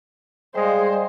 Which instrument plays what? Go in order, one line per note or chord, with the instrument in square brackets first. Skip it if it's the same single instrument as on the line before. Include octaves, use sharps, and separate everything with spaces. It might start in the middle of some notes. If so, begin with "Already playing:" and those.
[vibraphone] G3 D5 F5 [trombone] G#3 [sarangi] C5